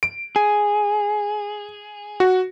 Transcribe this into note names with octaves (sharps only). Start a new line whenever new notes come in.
D7
G#4
F#4